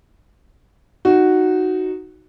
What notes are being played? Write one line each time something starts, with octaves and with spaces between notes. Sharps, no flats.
D#4 F#4